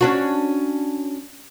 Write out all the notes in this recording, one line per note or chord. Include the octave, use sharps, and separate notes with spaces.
C#4 D4 F#4